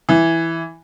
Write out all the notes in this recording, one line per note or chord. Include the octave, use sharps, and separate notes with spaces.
E3